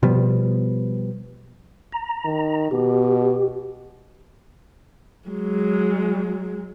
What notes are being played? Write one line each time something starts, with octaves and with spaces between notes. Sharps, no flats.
B2 F3 G3 B3
A#5
D#3
B2 G4
F#3 G#3